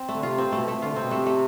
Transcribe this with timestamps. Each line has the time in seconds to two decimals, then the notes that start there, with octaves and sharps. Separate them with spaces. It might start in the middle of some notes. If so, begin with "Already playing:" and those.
Already playing: C4
0.09 D3 A3
0.23 C3 F4
0.38 C4
0.52 B2 A3
0.68 A3
0.82 D3 F4
0.91 C3
0.96 B2 C4
1.10 C3 A3
1.26 A3